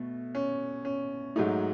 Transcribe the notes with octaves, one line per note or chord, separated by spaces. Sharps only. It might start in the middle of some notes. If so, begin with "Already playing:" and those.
Already playing: B2 A3
C#4
C#4
G#2 F#3 A3 D#4